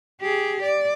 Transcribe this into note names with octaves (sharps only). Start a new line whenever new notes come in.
G4 G#4
D5